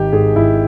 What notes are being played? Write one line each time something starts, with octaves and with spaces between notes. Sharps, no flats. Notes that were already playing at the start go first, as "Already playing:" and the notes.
Already playing: G#1 D#3 G4
G#2 G#4
G#1 E4